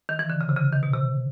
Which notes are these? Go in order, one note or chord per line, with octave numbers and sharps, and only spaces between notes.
D#3
E3
D3
C#3
C3
C#3
D#3
B2
C3